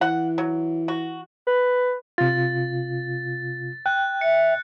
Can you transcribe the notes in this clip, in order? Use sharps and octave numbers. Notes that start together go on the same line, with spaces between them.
E3 F#5
F#3
F#4
B4
C3 F4 A6
G5 F#6
E5 C#7